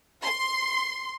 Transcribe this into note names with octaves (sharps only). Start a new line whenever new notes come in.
C6